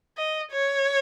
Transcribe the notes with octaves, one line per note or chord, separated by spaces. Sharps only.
D#5
C#5